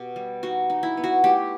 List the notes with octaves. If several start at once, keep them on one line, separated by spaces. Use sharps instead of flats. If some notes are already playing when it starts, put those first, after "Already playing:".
Already playing: B2 G4
G3
D#4 F#4
D#4
E4
B3
F#4
A3 G4